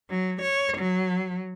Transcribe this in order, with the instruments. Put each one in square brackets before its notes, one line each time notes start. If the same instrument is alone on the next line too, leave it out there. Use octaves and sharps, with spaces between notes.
[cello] F#3
C#5
F#3